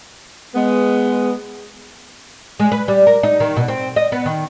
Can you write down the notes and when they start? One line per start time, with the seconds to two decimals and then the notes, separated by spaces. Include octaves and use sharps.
0.55 G#3 B3
2.60 G#3
2.72 B4
2.88 G3
3.07 A#4
3.23 D#4
3.40 D#3
3.56 B2
3.68 C4
3.96 D#5
4.12 B3
4.26 D#3